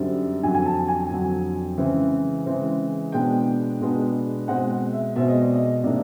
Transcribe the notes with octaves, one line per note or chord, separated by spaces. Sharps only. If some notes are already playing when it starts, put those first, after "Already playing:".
Already playing: F#2 D3 G3 C4
F2 D3 F#3 G#5
G#5
A5
G#5
F2 D3 F#3
C#3 E3 G#3 C4
C#3 E3 G#3 C4
B2 G#3 B3 D4 G5
B2 G#3 B3 D4
B2 G#3 C4 F#5
E5
B2 G#3 C4 E5
D#5
D5
D#5
C3 D#3 G3 A#3 D4 D5